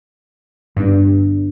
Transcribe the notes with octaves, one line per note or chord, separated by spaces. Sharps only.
G1 G2 D4